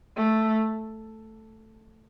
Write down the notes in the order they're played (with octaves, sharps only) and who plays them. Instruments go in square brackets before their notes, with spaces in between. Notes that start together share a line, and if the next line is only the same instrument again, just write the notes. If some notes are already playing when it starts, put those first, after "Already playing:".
[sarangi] A3